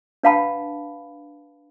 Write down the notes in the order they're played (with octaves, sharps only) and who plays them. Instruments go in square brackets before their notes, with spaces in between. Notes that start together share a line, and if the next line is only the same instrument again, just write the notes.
[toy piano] D4 B4 F5 F#5 A5 B5